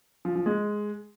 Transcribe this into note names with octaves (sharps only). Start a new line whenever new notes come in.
F3
F3
G#3